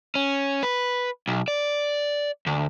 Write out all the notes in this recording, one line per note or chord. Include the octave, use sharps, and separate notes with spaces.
C#4
B4
B1
D5
D2